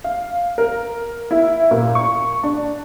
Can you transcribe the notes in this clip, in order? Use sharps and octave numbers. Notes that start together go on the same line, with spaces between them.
F5
A#4
E4
A#2
C#6
D4